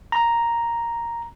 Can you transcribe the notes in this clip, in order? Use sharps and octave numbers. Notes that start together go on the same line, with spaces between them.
A#5